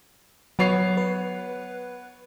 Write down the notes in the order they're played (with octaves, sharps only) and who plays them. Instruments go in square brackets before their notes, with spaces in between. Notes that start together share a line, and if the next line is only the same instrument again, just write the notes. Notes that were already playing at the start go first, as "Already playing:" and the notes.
[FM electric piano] F#3 [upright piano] B3 C#5 C7
[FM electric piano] B4